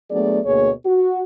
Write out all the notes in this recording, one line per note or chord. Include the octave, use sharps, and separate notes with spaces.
F#3 A3 B3 D4 G#4 D5
D2 B2 A#3 G#4 C#5
F#4